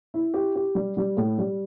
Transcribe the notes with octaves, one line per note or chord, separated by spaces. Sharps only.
E4
G4
G4
G3
G3
A2
G3